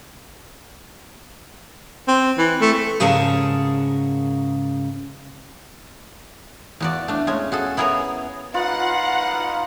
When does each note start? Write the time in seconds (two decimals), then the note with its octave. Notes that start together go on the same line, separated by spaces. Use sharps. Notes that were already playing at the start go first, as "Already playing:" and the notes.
2.08 C4
2.38 E3
2.61 A3
3.00 G#2 C#3 G#4 A#4 C#5 A5
6.80 E2 F#4 D5
7.08 A3 D4
7.27 G#3 A3 C#4
7.52 F#4 G#4 A4
7.77 B3 E4 G#4 A#4 C#5
8.54 D#4 F4 B4 F5 F#5